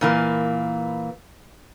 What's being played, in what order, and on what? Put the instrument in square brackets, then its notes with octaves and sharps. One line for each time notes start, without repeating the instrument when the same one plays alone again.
[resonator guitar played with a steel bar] A#2 E3 A#3